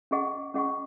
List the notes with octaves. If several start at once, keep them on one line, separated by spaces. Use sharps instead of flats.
C#4 G#4 D#5 F#5 C#6
C#4 G#4 D#5 F#5 C#6